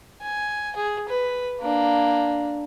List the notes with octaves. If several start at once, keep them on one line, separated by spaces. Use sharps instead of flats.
G#5
G#4
B4
A#3 D4